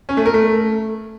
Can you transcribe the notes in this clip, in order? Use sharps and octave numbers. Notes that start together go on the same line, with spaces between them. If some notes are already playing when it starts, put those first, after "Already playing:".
C#4
A3
A#4
A3